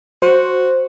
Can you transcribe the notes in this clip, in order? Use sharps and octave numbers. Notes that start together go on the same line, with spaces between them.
F#4 C5